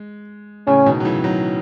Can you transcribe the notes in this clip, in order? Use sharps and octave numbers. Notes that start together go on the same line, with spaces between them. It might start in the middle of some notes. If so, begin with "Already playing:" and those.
Already playing: G#3
A2 C#3 C#4
B2 D#3
F#3
C#3 E3
D#3 F#3